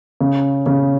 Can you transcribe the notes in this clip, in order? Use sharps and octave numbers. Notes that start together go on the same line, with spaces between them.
C#3
C#3